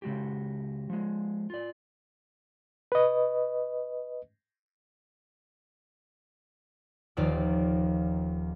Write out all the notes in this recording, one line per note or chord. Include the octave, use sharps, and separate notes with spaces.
C#3 G#3 F#4 G4
F3 G#3
F4 D5
B4 D#5
D#1 D#2 F3 F4 D5